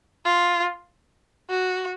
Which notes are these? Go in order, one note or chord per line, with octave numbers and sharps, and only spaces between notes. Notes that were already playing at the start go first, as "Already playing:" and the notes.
F4
F#4